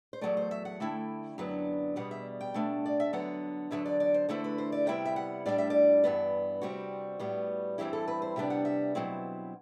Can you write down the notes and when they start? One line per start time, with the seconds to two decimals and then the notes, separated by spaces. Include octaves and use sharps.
0.13 C5
0.21 E2 C3 F#3 A3 D5
0.37 C5
0.51 E5
0.65 F#5
0.80 D3 A3 E4 G5
1.38 F#2 D3 F#3 B3 D4
1.96 E2 B2 G3 F#5
2.11 E5
2.41 G5
2.54 B2 A3 D4
2.86 D5
3.00 E5
3.13 D3 F#3 B3 F#5
3.71 E2 D3 F#3 E5
3.86 D5
4.00 D5
4.14 C5
4.29 E2 D3 A3 E4 C5
4.44 B4
4.58 C5
4.72 D5
4.87 C3 G3 B3 E4 G5
5.05 E5
5.16 F#5
5.46 A2 G3 D4 D5
5.58 E5
5.70 D5
6.04 G2 E3 B3
6.61 C3 G3 C4 F#4
7.19 A2 G3 B3
7.78 G2 E3 G3 C4 E4 G4
7.93 A4
8.08 B4
8.22 C5
8.36 C3 G3 B3 D4 E5
8.50 F#5
8.65 E5
8.95 B2 F#3 C4 E4